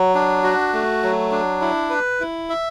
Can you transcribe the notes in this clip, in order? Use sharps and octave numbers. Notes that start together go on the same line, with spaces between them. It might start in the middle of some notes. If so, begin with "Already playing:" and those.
Already playing: F#3
D4
F#4
A3
F#3
D4
E4
B4
E4
E5